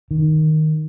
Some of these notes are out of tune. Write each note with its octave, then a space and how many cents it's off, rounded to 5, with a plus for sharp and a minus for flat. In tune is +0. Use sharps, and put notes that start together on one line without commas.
D#3 +0